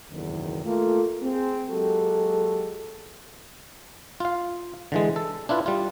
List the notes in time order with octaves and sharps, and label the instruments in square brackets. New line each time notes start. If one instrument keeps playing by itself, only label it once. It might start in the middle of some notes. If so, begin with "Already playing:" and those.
[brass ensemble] F#1 B1 E2 G#2 D#3
A3 A#3 F4 A4
C4 G#4
F#3 G#3 A#3 F#4 G4 A4
[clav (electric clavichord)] F4 F5
D3 E3 G#3
A4
D4 E4 F4 B4
G3 F4